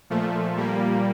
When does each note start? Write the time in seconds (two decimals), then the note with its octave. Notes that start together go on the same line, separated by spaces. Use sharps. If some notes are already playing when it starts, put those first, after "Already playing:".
0.10 A#2 F3 A3
0.57 A#2 G3 A#3